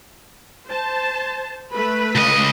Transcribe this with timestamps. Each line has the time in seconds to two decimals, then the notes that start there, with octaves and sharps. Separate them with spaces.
0.67 C5 A5
1.73 A3 B4 B5
2.15 C#2 D#5